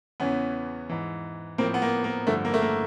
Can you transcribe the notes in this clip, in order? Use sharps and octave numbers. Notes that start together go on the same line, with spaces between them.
E2 C#3 E3 B3 C#4
G#2 E3
A2 F3 A#3 C4
B3
A#3
A#3
G2 D3 F3 A3
A#3
A3
A#3